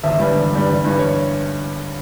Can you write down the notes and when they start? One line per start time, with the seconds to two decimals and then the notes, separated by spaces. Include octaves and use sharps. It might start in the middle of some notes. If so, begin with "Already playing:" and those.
0.03 G1 E5
0.19 G2 E3 G3
0.36 G1
0.52 G2 E3 G3
0.67 G1
0.84 G2 E3 G3
0.99 C#5